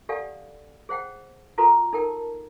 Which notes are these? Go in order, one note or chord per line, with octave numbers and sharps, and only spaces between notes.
G4 A4 D5 F5 F#5 G#5
G#4 C5 F#5 G5
F4 F#4 A4 B4 A#5 C6
D#4 A4 A#4 G5 A5